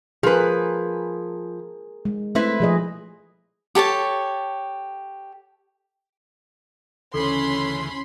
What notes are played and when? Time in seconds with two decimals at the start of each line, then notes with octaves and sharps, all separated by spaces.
0.23 F3 G#4 A#4 B4
2.05 G#3
2.35 A3 C4 E4 B4
2.60 F3 G#4 D#5
3.75 G4 A4 C#5 A5
7.14 D2 C#3 E3 C#4 A4 B5 C6